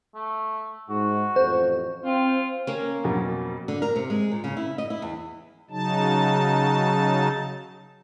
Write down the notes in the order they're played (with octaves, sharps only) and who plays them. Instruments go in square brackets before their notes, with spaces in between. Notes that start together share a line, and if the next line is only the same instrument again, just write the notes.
[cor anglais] A3
[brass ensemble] G#2 [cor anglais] F#4
[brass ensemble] A1 F2 F3 [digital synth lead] C5
[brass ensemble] C4 [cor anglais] F4
[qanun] A#3 C#4
[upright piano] F2 B2 F#3
[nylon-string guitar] D3
A#4
C3
G#3
A#2
C#3
E4
D#5
E4
E2
[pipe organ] C#3 F#3 D#4 A5